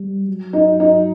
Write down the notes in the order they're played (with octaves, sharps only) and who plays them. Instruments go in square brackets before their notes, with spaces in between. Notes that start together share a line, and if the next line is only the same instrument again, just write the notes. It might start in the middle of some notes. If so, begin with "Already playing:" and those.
Already playing: [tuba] G3
F#3
[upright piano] D#4
D#4